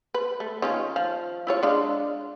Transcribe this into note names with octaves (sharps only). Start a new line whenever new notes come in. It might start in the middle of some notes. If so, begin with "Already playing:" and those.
B4
A3
D#3 C#4 F4
F3 F5
E4 F4 C#5
G#3 D4 F5